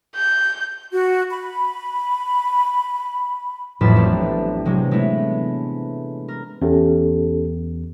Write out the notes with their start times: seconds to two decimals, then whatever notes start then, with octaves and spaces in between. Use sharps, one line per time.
0.16 G6
0.93 F#4
1.30 B5
3.81 A1 F2 A2 F#3 A5 B5
3.95 G3 A3 B3 C4 D4
4.65 C3 F#3 G#3
4.91 G#3 A3 B3 E4
6.28 A#4
6.62 E2 C#4 G4 A4